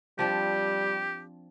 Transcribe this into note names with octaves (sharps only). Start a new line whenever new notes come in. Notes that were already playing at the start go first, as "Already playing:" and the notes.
F3 G3 C4 D4 G4